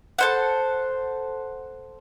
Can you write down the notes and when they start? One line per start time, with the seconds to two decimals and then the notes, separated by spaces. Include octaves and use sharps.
0.19 A4 C5 F#5